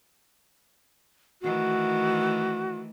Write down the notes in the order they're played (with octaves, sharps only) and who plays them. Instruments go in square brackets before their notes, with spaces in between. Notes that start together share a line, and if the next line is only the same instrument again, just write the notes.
[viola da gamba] D#3 E3 A3 [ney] F#4